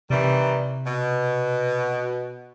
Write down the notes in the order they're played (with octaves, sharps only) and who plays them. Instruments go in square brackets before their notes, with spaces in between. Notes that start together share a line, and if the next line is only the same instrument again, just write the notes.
[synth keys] C3 [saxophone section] D#3 E3 G3
[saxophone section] B2